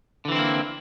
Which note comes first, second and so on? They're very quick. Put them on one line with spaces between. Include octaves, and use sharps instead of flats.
D3 E3 C4 E4 A#3